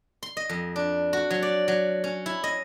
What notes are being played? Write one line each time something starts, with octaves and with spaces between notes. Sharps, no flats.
C6
D#5
F2
D4
F#4
F#3
D5
F#3
C#4
E4
D#5